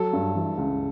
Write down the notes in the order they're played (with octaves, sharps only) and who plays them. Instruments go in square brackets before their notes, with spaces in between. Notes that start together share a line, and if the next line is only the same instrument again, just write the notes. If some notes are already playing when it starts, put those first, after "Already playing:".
Already playing: [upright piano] F#3 [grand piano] A4
[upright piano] G2
E3
C#2